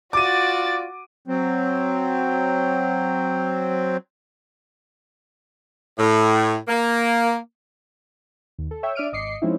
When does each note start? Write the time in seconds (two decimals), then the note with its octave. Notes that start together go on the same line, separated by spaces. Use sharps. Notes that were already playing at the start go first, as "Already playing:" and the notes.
0.13 F4 F#4 D5 D6 A6 D#7
1.27 F#3 C4
5.99 A2
6.68 A#3
8.59 D#2
8.71 A4
8.83 C#5 E5 G5
8.95 D4 D5 E5 F6 D7 D#7
9.12 G#1 D#5 D6 C7 C#7
9.42 F3 G#3 C4 C#4 D#4 E4